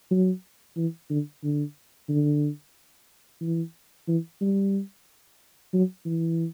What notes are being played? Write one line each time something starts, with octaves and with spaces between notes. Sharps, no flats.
F#3
E3
D3
D3
D3
E3
E3
G3
F#3
E3